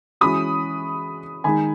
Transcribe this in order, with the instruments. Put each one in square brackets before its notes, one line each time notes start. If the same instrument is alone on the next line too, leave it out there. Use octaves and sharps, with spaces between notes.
[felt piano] E3 G#3 C#4 F#4 [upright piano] B5 D#6
[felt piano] D#3 G#3 D#4 [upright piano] G#5 B5